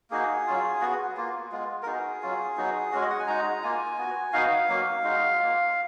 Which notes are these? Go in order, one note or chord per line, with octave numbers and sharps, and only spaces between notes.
A#3 D#4 F#4 G#4
F#3 C#4 F4
B3 F#4
A#3 F4
G#3 B3 F4
A#4
B3 D#4 F#4 G#4
F#3 C#4 F4
F#3 B3 D#4 F#4
G#3 C#4 F#4
D#5
F#5
G#5
G#3 D#4 F#4 A#5
A#3 F4 G#5
B3 F#4
B3 D#4 F#4 F5
F#3 A#3 C#4
G#3 D#4 F#4
A#3 F4